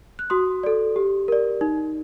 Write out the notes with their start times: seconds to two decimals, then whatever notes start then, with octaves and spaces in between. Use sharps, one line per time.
0.19 F#6
0.30 F#4 C6 D#6
0.63 A4 D5
0.96 G4
1.28 A#4 D5
1.61 D#4